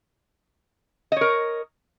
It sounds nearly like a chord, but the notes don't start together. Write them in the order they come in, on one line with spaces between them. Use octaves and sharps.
D#5 C#5 A#4